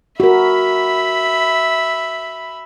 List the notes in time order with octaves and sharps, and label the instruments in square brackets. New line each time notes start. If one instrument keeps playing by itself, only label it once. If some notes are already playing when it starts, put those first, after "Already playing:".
[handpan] F#4 A#4 [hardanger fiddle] E5 B5